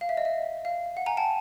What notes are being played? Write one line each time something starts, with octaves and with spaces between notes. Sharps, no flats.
F5
E5
D#5
E5
F5
F#5
G#5 A#5
G5 A5